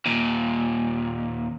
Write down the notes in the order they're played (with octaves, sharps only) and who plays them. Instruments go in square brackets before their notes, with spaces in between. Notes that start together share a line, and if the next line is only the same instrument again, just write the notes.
[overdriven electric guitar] D#2 A#2